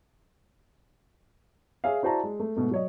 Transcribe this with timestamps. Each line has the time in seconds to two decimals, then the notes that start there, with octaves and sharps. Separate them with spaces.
1.84 G#4 C#5 E5 F5
2.03 E4 F#4 C5 D5 A5 A#5
2.23 G#3
2.40 A3
2.57 G#2 B2 A3
2.71 F#3 C#5 D#5